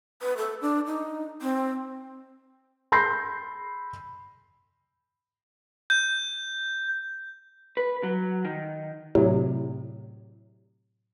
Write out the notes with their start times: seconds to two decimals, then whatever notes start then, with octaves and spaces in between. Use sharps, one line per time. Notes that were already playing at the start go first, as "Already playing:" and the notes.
0.22 B4
0.37 A4
0.62 D4
0.87 D#4
1.42 C4
2.92 B5 C6 G6 A#6 C7
5.90 G6
7.77 B4
8.03 F#3
8.45 D#3
9.15 A2 C3 F#3